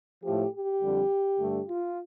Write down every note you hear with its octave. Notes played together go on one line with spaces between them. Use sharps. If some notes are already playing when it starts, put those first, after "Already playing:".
A2 F3 A3 G4
G4
F2 D3 G3
G2 D3 A3
F4